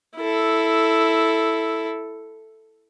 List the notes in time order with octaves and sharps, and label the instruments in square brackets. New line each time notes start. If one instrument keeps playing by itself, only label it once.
[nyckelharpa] E4 A4